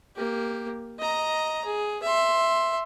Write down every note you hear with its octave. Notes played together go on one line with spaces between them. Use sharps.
A#3 G4
D#5 A#5
G#4
E5 C6